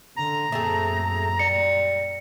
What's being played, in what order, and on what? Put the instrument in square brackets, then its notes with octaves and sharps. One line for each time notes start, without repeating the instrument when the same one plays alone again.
[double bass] D3 [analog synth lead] A#5
[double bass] F#2 A#2 [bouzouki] A3 C4 G#4
[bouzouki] G3 [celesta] C#7